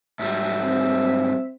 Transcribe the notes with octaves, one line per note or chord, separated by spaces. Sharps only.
G#2 F#3 G3 E5
C4